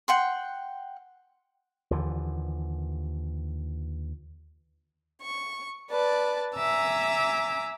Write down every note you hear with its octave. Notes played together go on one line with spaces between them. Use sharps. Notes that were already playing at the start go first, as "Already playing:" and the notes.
F#5 G5 C6
D#2 D3 E3 F3
C#6
B4 D5 A5
E5 G#5 A#5 D6 E6